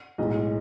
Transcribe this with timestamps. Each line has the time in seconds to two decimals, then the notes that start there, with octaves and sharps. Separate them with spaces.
0.18 B1 A2 G#3 D#5